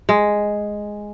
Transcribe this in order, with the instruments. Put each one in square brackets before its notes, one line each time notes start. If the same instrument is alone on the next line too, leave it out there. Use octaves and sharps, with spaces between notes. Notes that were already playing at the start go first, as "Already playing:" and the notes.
[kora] G#3